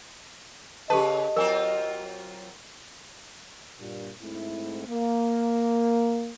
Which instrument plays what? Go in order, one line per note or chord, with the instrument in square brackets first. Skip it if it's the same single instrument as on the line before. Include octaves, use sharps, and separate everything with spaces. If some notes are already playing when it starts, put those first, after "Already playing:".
[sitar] C#3 B4 [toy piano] G4 A4 A5 [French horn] D#5
[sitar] F#3 C4 F4 [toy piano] A#4 G#5
[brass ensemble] G2 A#2
G#2 A3 C4 E4
A#3